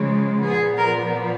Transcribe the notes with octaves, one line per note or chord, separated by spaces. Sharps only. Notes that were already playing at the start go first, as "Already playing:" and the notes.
Already playing: C#3 F3 G#3
A#2 F3 B3 G#4
A#4